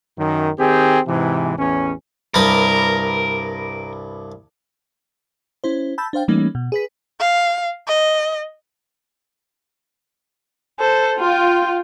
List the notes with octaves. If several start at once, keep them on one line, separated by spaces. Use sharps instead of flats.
F#2 D#3
D#3 C4 G4 G#4
G#2 C3 E3
A1 E2 C#4
C2 G2 A#4 B4
C#4 E4 C5
A5 B5 E6 G6 A6
D4 C5 F5 G5
E3 G3 A3 A#3 C#4 D#4
B2
G#4 B4 B6
F5
D#5
A4 C5
F4 G5